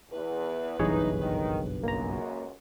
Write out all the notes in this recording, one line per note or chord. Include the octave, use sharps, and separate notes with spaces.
E2 B4
F#1 B1 G2 E3 D#4 G#4 C#5
D#3
C#2 F#2 A#3 A#5